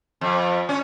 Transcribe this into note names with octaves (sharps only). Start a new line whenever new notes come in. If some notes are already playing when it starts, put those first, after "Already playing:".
F2
C#4